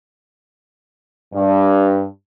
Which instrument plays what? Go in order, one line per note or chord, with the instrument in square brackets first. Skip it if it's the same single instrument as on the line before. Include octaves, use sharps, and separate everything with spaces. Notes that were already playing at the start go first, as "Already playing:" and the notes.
[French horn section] G2